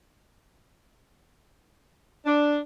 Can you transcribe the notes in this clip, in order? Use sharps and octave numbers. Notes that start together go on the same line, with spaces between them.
D4